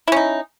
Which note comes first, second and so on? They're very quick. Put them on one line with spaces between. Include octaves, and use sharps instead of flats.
E4 C#4 D#4